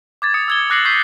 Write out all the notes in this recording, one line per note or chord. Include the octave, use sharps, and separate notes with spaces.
D6 G#6 A6
D#6 C#7
E6 G#6 G7
D6 F#6 A#6 C7 C#7 F#7
C#6 G6 B6 C7